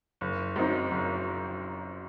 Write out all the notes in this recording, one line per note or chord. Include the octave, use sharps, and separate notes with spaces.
F#1
F#2 F#3 C4 D#4
F#1